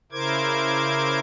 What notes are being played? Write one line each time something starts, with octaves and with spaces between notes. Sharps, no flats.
C#3 E4 A#4 C5 D6 G#6